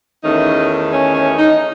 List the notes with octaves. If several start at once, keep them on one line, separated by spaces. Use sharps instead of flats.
E2 D#3 A3 C#4 D#4
C#4
C#4
D#4